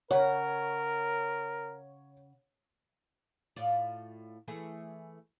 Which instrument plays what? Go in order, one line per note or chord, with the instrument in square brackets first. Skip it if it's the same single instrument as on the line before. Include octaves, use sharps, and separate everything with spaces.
[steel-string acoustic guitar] C#3 F#5 [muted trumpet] A#4 [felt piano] C#5
[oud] A2 F4 D5
E3 A3 G#4